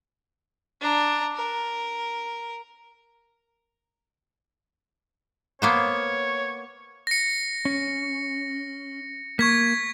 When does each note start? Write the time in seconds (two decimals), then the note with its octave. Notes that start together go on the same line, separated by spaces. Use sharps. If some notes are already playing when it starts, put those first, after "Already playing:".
0.81 D4 A#5
1.36 A#4
5.62 A#3 B3 C5 C#5
7.07 A#6 C#7
7.65 C#4
9.39 A#3 C#6 G#6 B6